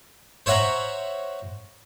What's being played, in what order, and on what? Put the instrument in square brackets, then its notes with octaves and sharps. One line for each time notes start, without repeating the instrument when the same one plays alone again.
[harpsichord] C5 C#5 E5 F#5 A#5